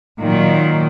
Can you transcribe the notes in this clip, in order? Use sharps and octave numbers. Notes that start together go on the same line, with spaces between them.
A#2 D#3 F#3